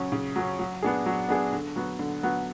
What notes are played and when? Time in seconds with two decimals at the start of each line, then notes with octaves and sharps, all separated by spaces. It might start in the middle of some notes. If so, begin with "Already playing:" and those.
Already playing: C#3 F#3 C#4
0.12 C#3
0.36 F#3 C#4
0.59 F#3
0.82 B3 D4 G#4
1.06 F#3
1.29 B3 D4 G#4
1.53 D3
1.76 F#3 B3
1.99 D3
2.23 F#3 B3